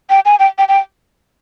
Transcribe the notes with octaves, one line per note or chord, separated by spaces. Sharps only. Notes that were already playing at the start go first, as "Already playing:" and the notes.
G5
G#5
G5
G5
G5